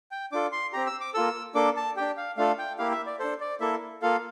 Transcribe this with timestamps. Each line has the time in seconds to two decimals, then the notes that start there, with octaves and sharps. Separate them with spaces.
0.11 G5
0.32 D4 F4 A4 D6
0.52 C6
0.73 C4 G4 A#5
0.87 E6
1.01 D6
1.14 A#3 F4 A4 E6
1.55 A#3 D4 A4 D6
1.76 A5
1.97 D4 G4 G5
2.17 F5
2.37 A3 D4 F4 A4 F5
2.58 G5
2.78 A#3 E4 G4 F5
2.92 E5
3.06 D5
3.19 D4 A4 C5
3.40 D5
3.60 A#3 E4 A4 E5
4.02 A#3 F4 A4 F5